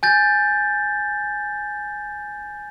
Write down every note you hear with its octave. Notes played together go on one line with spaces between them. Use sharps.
G#5 G6 A6